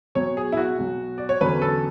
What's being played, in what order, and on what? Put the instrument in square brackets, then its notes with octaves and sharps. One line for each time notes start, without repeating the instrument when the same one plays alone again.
[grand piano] B1 B2 F#3 [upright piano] C#5
[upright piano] G#4
E4
F#4
[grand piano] B1 B2 F#3
[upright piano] D5
C#5
[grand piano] E2 D3 F#3 C#4 [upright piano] B4
[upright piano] A4